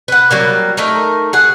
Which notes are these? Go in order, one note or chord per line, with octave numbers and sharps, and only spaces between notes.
B4 F#5
F#3 G3 A#3
A3 D#4 A#4
G#4 F#5